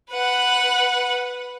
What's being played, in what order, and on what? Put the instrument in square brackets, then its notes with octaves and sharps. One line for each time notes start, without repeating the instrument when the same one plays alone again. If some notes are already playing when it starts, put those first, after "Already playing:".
[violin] B4 F#5